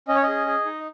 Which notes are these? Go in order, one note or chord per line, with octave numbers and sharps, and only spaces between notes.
C#4 D#5
C#5
G#4 D#5
G#4
D#4